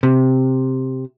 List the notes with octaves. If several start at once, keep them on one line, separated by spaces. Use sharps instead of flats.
C3